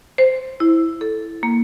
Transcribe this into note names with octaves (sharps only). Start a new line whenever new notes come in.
C5
E4
A4
A#3